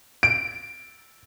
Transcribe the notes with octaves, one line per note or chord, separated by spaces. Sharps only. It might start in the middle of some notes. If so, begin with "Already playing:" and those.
D7